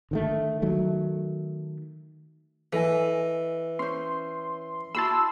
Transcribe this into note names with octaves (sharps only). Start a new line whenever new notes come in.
D3 D#3 A3
D#3 F#3 A3
E3 A4 D#5 G#5
C#4 C5 C6
E4 F#4 A5 B5 C6 E6